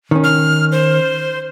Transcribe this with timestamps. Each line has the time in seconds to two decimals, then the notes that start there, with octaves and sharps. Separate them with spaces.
0.11 D#3 C#4
0.24 F6
0.72 C5